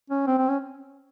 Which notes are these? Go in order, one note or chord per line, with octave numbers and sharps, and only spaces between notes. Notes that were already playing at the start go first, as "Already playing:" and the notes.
C#4
C4
C4
C#4